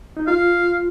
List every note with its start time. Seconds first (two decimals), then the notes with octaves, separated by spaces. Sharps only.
0.17 D#4
0.27 F4 F5